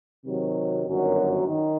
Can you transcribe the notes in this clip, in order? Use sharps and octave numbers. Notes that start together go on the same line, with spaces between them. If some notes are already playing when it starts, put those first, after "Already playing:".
C3 D#3 F#3
G1 F#2 D#3 F#3
D#3